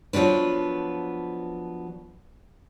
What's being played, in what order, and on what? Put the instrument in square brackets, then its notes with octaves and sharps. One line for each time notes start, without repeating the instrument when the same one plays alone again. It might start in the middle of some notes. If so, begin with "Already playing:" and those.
[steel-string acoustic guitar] F3 F#3 B3 D4 B4